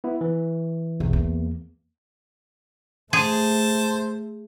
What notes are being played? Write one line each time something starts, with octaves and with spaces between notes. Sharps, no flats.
B3 E4
E3
B1 E2
A#3
A3 G#4 C5 A5